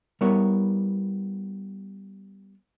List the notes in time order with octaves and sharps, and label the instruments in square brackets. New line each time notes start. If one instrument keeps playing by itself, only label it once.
[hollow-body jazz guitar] G3 B3 E4 A#4 C#5